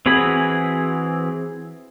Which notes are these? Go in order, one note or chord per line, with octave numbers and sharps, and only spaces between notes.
E3 C4 F#4 G#4 B5